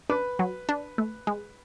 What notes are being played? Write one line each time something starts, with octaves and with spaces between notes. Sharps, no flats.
D4 B4
F#3
D4
A3
G#3